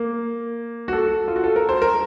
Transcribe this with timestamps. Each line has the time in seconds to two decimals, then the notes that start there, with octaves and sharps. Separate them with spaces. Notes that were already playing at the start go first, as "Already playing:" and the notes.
Already playing: A#3
0.88 F#4
0.93 A4
1.28 F4
1.36 F#4
1.44 A4
1.56 A#4
1.69 C5
1.82 A#4